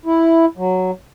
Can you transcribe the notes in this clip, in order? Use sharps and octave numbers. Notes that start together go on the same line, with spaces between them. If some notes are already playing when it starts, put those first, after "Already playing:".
E4
F#3